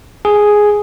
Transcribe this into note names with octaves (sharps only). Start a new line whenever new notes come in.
G#4